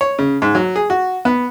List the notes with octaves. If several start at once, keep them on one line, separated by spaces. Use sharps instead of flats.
C#5
C#3
G#2
F#3
G#4
F#4
B3